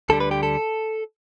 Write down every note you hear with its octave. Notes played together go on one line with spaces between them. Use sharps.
D2 D3 G3 A4
B4
G4
A4